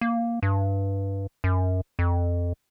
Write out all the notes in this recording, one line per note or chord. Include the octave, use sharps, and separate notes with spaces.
A#3
G2
F#2
F2